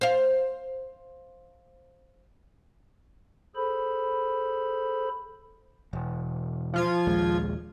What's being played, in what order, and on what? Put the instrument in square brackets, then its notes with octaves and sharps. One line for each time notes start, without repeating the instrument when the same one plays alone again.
[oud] C5 F5
[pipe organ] G#4 A4 C5 B5
[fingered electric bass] E1
[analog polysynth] F3 F4 G#6
[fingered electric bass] A#1 D#2 G#3